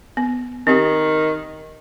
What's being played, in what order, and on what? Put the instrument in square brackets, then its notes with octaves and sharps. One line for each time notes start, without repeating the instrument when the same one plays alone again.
[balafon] B3
[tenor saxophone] D#3 [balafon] C4 G4